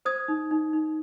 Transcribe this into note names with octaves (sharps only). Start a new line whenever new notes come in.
C5 D#6 G#6
D#4
D#4
D#4